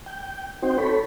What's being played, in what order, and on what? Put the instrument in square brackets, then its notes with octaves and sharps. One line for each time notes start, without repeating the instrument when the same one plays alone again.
[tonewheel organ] G5
C4 D#4 F#4 C5 G5
A4 C#5 B5